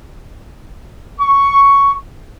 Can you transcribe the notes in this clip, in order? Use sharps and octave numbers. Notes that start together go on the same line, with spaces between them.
C#6